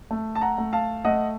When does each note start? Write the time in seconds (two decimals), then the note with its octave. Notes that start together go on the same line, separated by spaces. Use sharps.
0.11 A3
0.35 A5
0.41 F#5 A#5
0.58 A3
0.73 F5 A5
1.05 A3 D#5 F#5